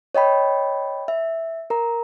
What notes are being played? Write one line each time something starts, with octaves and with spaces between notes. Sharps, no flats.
C#5 D#5 G5 B5
E5
A#4 A#5